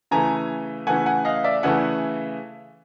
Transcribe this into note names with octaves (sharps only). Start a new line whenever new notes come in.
C#3 E3 A3 G#5 A#5
C#3 E3 A3 F#5 G#5
F#5 G#5
D#5 F5
D5 E5
C#3 E3 A3 F#5 G#5